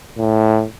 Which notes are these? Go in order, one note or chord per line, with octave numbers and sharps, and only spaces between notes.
A2